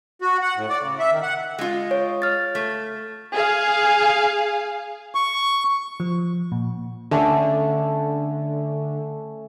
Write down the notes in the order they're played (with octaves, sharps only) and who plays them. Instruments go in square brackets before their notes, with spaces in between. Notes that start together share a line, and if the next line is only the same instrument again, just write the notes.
[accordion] F#4
F#5
A2
D5
C#3
E5
D#3
F#5
[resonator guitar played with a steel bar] G#3 F4
[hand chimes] C#5
F6 A6
[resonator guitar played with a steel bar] A3
[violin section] G#4 F5
[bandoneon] C#6
[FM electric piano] F3
A#2
[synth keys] D3 [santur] A3 C#4 A4